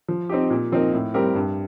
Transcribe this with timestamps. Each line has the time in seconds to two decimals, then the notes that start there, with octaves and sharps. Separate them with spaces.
0.08 F3
0.29 C4 D#4 G4
0.50 A#2
0.72 F3 C4 D#4 A#4
0.93 A2
1.14 G3 C4 G4 A#4
1.35 G2